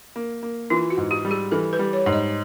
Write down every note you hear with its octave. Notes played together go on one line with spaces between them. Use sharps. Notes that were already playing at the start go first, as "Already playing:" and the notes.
A#3
A#3
E3 F4
F#4
G#2
G4
G3
G#4
E3 A4
B4
G3
C#5
G#2
D#5